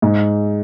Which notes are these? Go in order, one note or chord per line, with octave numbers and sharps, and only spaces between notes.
G#2